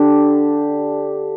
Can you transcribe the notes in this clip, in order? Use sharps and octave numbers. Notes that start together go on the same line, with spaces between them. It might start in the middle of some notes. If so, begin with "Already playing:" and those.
Already playing: D3 D4 G4